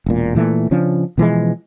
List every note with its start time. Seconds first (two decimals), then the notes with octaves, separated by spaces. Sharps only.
0.06 E1 A#2
0.35 A#2 E3 A3
0.71 C#3 F3 C#4 D4
1.18 B2 E3 F3 G#3